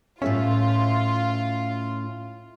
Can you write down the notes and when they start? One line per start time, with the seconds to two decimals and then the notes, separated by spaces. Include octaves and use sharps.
0.22 A2 C#4 F4 A4 E5